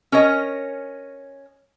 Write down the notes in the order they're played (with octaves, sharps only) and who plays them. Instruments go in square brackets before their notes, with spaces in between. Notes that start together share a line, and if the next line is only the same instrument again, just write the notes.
[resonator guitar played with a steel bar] C#4 A#4 C#5 D#5